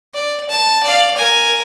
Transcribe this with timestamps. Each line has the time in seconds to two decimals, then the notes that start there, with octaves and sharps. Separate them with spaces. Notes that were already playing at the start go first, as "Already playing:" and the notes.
0.14 D5
0.49 A5
0.83 D5 F5
1.17 A#4 G#5